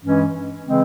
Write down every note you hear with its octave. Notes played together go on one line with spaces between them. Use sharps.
G2 E3 G#3 C#4
C#3 E3 G#3 C4